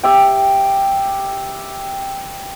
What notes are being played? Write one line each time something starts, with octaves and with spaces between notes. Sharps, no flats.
G4 E5 G5